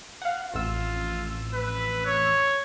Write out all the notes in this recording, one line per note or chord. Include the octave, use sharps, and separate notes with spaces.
F5 F#5
A1 F2 F4 E6
B4
C#5